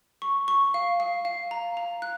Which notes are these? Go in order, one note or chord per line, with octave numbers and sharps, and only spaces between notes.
C#6
C#6
F5
F5
F5
A#5
A#5
F#6